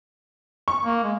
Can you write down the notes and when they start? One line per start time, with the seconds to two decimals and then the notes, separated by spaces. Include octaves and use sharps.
0.68 C#6
0.85 A#3
1.04 G#3